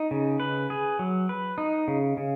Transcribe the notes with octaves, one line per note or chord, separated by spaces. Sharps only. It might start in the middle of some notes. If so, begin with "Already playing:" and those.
Already playing: D#4
C#3
B4
G#4
F#3
B4
D#4
C#3
C#3